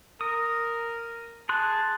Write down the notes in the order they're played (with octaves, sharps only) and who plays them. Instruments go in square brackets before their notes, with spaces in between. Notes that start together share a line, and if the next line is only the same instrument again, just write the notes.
[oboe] A#4 [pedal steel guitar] D#6
[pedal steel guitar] G#4 C6 F#6 [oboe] A5